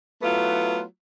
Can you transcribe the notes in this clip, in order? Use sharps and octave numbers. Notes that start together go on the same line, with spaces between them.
F#3 A3 B3 E4 F4